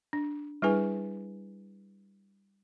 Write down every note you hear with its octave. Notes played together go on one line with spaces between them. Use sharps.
D4
G3 D4 E4 G#4 B4 G#5